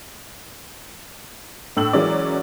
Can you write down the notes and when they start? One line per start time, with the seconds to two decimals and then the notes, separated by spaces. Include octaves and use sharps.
1.77 A2 D4 E6 F#7
1.93 E3 F#3 G#3 C#4 A#4 D5